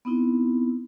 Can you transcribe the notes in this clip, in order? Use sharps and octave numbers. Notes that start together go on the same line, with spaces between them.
B3 C4 D#4 E4